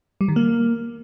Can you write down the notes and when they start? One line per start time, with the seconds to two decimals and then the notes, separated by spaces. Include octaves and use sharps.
0.21 G3
0.28 D#3
0.36 A#3